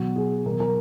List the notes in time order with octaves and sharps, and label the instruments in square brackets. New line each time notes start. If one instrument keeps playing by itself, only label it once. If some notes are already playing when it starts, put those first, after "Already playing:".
Already playing: [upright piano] B2 F#3 F#4
G#4
B2 F#3 A#4
A#4